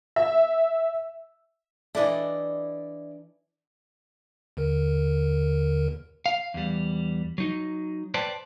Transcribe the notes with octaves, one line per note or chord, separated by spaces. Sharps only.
E5
E3 D4 E4 A4 D5 D#5
D#2 D3 A#4
F5
E2 G3
F#3 D#4
B4 C5 D5 G5 A5